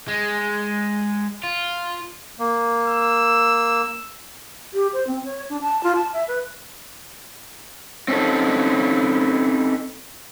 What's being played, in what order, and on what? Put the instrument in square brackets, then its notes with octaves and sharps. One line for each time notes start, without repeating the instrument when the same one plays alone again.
[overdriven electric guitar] G#3
F4
[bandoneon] A#3
[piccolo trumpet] E6
[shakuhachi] G4
C5
C4
C#5
D4
A5
F4
A5
E5
B4
[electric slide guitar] C4 C#4 D#4 A4